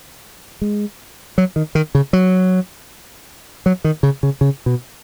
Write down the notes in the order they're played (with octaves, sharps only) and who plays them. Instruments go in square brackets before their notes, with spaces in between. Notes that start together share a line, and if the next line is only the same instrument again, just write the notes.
[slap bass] G#3
F#3
D#3
D#3
C#3
F#3
F#3
D#3
C#3
C#3
C#3
B2